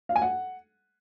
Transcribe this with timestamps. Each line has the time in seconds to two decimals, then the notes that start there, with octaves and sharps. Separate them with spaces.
0.09 F5
0.16 G#5
0.22 F#5